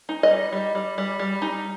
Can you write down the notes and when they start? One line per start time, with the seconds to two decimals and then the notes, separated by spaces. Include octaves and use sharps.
0.09 D#4
0.23 D#5
0.30 G3
0.52 G3
0.75 G3
0.98 G3
1.19 G3
1.42 D#4